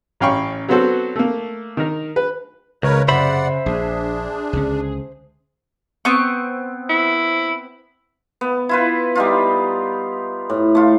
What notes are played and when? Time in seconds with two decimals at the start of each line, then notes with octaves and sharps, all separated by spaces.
0.20 A1 C#4 F5 G5 B5 C#6
0.68 F#3 B3 C4 F#4 A4 C5
1.16 A3 A#3
1.77 D#3 A#4
2.16 B4
2.83 C#2 C#3 A#4 B4 C#5
3.08 F#2 C3 C5 D5 E5 F#5 B5
3.66 A#1 D4 G#4
4.53 C#2 D3 C#4
6.05 B3 C4 C#6
6.90 E4
8.41 B3
8.69 E4 F4 B4
9.15 G3 D#4 F4
10.50 A2
10.75 A3 F4